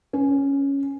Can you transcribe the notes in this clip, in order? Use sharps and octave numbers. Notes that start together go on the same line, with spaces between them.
C#4